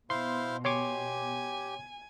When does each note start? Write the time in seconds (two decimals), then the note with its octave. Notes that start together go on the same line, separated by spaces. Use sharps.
0.10 B2 E4 C5 F5 C6
0.65 G4 C#5 G#5 C6 D6